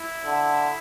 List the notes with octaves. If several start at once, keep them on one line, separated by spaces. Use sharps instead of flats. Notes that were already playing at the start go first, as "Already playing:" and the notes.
Already playing: E4
D3